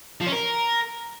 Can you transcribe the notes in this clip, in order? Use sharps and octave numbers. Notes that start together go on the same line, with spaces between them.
F3
C#4
A#4